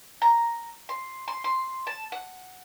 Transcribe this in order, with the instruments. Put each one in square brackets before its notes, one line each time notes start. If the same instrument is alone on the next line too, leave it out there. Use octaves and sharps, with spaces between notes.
[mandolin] A#5
C6
C6
C6
A5
F#5